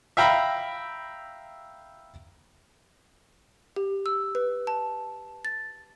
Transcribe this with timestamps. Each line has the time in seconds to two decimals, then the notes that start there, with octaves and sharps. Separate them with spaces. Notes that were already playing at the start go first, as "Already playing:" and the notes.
0.17 E5 F5 G5 A#5 B5 E6
3.76 G4
4.06 E6
4.35 B4
4.67 A5
5.45 A6